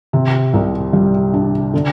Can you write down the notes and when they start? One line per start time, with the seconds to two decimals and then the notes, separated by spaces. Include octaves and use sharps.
0.13 C3
0.54 C2
0.93 G3
1.34 D4
1.74 D3